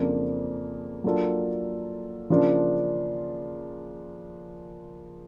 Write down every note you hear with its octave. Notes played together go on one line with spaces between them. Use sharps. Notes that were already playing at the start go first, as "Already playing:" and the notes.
Already playing: F2 C#3 F3 A#3 D4
F#3 A#3 D4 F4 A4
C#3 F3 A#3 D4 F4